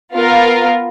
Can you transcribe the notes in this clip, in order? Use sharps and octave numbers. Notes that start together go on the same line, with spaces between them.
B3 F4 A#4